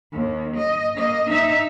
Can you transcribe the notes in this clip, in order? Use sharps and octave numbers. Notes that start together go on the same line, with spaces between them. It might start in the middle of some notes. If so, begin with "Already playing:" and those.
D#2
D#5
A#3 D#5
D#4 E5